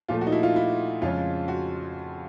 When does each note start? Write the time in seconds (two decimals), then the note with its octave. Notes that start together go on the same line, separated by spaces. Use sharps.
0.09 A#2 F3 A3 F4
0.21 F#4
0.27 D#4
0.32 E4
0.43 F4
0.56 E4
1.02 F2 C#3 F3 G#3 C#4 F4
1.48 F#4